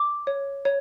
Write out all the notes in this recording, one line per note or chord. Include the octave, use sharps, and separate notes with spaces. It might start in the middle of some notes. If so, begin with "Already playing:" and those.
Already playing: D6
C#5
C#5